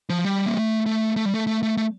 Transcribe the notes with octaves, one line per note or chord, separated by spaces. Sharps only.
F3
G3
A#3
A3
A3
A3
G3
A3
A3
A3
A3